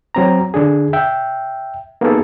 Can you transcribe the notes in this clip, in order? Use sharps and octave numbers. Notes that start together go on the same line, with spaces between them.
F#3 C4 A#5
D3 D4 G#4
E5 G5
A#3 B3 D#4 F#4 G#4 A4